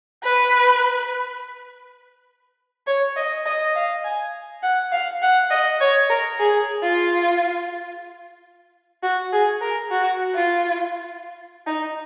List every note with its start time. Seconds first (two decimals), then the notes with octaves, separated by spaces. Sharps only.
0.23 B4
2.87 C#5
3.16 D#5
3.46 D#5
3.75 F5
4.04 G#5
4.63 F#5
4.92 F5
5.22 F#5
5.51 D#5
5.80 C#5
6.10 A#4
6.39 G#4
6.83 F4
9.03 F#4
9.32 G#4
9.61 A#4
9.91 F#4
10.35 F4
11.67 D#4